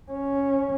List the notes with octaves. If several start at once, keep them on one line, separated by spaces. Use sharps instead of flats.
C#4